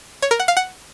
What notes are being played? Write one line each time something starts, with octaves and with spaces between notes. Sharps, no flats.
C#5
A#4
F#5
F5
F#5